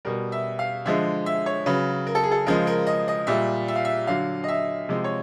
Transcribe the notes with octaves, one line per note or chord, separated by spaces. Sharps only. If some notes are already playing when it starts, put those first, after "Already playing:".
B2 G3 A#4
E5
F5
D3 F3 G#3 E5
E5
C#5
C#3 F#3 B4
A#4
A4
G#4
A4
C#3 F3 G#3 A#4
A#4
D#5
D#5
A#2 G3 E5
E5
F5
E5
D3 F#3 F5
D#5
E5
C3 F3 G#3
C#5